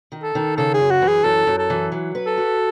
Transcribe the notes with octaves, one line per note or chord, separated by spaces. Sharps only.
D#3
A4
D#3
C#3 A4
G#4
F#2
F#4
E3
G#4
F#2 A4
F#2
A4
E3
F#3
B4
A4
F#4